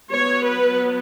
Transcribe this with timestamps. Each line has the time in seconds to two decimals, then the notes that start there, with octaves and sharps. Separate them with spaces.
0.11 F#3 B3 C#5
0.43 B4